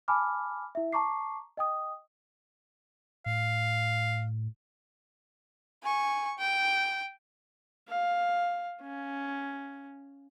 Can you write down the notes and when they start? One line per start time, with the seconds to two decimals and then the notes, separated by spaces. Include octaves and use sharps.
0.08 G#5 A5 B5 D6 F6
0.75 E4 E5
0.93 A5 A#5 C#6 D6 C7
1.57 D#5 G5 D#6
3.26 A2 F5
5.83 G#5 C#6
6.39 G5
7.88 F5
8.82 C#4